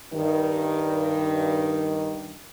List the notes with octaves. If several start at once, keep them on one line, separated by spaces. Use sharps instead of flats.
G2 D#3